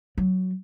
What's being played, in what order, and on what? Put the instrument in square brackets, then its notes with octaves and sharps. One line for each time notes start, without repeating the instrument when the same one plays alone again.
[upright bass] F#3